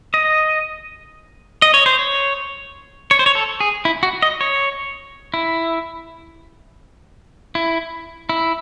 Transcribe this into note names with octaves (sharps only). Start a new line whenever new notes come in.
D#5
D#5
C#5
C5
C#5
C#5
C5
C#5
A4
G#4
E4
F#4
D#5
C#5
E4
E4
E4